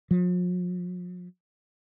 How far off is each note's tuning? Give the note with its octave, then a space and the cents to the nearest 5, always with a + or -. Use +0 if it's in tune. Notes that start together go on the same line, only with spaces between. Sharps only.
F3 +45